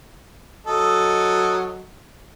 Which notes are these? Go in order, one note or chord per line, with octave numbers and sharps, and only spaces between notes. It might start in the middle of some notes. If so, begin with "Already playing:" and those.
F#3 A4 D#5